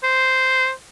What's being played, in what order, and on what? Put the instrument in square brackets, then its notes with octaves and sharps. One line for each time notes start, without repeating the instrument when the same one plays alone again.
[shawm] C5